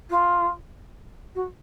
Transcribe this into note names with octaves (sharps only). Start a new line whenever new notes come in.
F4
F#4